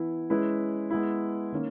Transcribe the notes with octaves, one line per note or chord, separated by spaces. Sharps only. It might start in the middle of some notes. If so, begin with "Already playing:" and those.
Already playing: E3 B3 E4
G#3 C#4 E4 B4
G#3 B3 E4
D#3 A#3 C#4